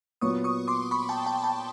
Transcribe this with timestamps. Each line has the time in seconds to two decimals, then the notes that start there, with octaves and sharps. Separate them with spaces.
0.21 A#2 F#3 B3 C#6 D#6
0.44 C#6 D#6
0.68 C6 D6
0.91 B5 C#6
1.09 G5 A5
1.26 G5 A5
1.44 G5 A5